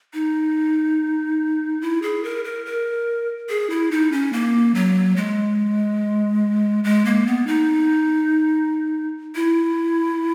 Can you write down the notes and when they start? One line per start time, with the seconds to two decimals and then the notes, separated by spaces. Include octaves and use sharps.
0.14 D#4
1.81 E4
2.02 G#4
2.24 A#4
2.44 A#4
2.66 A#4
3.49 G#4
3.70 E4
3.91 D#4
4.12 C#4
4.33 A#3
4.75 F#3
5.16 G#3
6.84 G#3
7.05 A#3
7.26 B3
7.47 D#4
9.35 E4